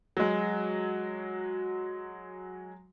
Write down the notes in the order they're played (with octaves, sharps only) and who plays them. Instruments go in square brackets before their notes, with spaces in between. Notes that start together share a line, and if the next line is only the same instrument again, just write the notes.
[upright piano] F#3 G#3